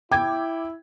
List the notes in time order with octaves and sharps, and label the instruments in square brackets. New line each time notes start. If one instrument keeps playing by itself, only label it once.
[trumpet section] E4 [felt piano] G5 [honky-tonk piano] D6 G#6